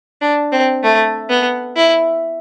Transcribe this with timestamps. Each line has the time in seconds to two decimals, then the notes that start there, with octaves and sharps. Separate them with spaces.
0.21 D4
0.52 C4
0.83 A3
1.30 B3
1.77 E4